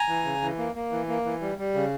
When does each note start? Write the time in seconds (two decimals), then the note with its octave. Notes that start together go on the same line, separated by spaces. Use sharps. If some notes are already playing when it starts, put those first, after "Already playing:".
Already playing: G#5 A#5
0.08 E3
0.25 C#3
0.42 E3
0.58 A#3
0.75 A#3
0.91 E3
1.08 A#3
1.25 E3
1.41 G3
1.58 G3
1.74 C#3